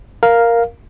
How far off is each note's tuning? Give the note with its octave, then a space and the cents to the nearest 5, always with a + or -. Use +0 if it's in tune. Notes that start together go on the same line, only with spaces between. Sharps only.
A#4 +0 F5 +0